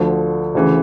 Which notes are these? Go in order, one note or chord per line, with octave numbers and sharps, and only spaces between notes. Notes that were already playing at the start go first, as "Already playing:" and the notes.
Already playing: D2 D3 F3
D2 C#3 E3